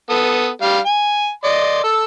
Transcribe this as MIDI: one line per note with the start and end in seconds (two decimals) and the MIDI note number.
0.10 0.48 59
0.10 0.48 69
0.10 0.48 87
0.62 0.78 55
0.62 0.78 77
0.86 1.29 80
1.44 1.80 74
1.44 1.80 75
1.44 1.80 84
1.84 2.05 69
1.84 2.05 88